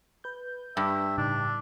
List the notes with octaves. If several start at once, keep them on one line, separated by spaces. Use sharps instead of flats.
B4 G6
G2 E5
A2 C#3 D4 D#4